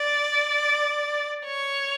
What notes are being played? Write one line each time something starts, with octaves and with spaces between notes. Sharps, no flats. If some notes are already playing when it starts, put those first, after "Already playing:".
Already playing: D5
C#5